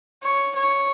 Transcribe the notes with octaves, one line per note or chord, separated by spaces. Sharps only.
C#5
C#5